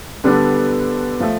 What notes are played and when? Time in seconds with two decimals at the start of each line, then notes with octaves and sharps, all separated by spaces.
0.24 D3 G3 B3 D4 A4
1.20 F3 A3